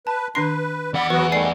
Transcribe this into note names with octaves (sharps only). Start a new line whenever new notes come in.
B4 A5
D#3 D4 B4 C6 C7
E2 D5 F#5 B5
E3 F#3 B3 F#4 B4
D#3 G3 A3 D5 G#5 C7